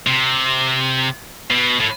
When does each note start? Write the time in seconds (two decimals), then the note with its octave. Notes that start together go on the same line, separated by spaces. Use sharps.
0.07 C3
1.51 B2
1.80 A2